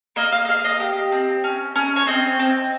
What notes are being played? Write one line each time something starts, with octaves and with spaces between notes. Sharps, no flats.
A#3 D#5
F5
D#5
G#4 F5
D#5
G4
C4
C#4
C#4
C#5
C4 D#5
C4